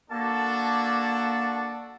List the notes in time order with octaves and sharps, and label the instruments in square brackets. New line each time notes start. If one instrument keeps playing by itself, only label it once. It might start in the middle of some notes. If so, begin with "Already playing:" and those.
[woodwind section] A#3 A5 [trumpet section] D4 F#4 A4